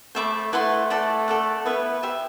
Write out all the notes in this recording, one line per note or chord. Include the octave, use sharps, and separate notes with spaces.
A3 C5 E5 B5 D6
A3 E4 B4 F#5 C6
A3 A4 D5 F#5
A4 D5 F#5
B3 E4 B4 E5
G4 C5 E5